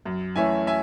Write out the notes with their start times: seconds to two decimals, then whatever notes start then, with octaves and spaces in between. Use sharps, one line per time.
0.05 F#2
0.36 E3 A3 C#4 E5 G#5
0.67 E5 G#5